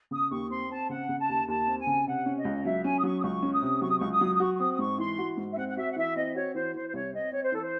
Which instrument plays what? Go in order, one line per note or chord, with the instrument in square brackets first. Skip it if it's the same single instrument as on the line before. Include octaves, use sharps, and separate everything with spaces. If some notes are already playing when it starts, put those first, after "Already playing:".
[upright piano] C#3 [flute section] D#6
[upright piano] D#2 [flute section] C#6
[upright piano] C4 [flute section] C6
[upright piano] C4 [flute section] A5
[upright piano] C#3 [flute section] F#5
[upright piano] C#3
[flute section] A5
[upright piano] D#2
[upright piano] D#2 [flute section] A5
[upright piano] C4
[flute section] G#5
[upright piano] C#3
[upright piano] C3 [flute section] F#5
[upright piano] C#4
[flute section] D#5
[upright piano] C#2
[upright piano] F#3 [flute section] E5
[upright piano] C#4 [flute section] G#5
[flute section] D#6
[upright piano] F#3 [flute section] C#6
[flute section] D#6
[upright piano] C#2 [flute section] C#6
[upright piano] C#4
[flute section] D#6
[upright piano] C3
[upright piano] F#3 [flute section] C#6
[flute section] D#6
[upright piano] C#2 [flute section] C#6
[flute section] D#6
[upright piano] F#3
[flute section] D#6
[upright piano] F#4 [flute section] C#6
[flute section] C#6
[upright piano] C4 [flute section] D#6
[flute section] D#6
[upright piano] G#2 [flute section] C#6
[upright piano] E3 [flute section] C6
[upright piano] F#4
G#2
[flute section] E5
[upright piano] C4 [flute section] F#5
[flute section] F#5
[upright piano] F#4 [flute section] E5
[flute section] F#5
[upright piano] E3 [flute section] E5
[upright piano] C4 [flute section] D#5
[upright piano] F#4 [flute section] C#5
[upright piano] E3 [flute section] C5
[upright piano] E3 [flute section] C5
[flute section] C5
[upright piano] C2 [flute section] C#5
[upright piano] C4 [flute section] D#5
[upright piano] C4 [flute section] C#5
[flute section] C5
[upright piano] E3 [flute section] A4
[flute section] C5